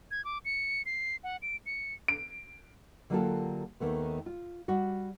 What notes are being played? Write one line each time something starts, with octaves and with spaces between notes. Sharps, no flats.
G#6
D6
C#7
C7
F#5
D7
C#7
D7
D3 F#3 A#3 F4 G4 A4
D#2 D#3 A3 B3
F4
G3 F#4